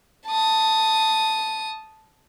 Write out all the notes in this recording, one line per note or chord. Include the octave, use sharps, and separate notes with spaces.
A5 D#6